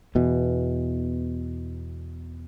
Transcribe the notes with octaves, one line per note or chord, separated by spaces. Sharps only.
E2 B2 E3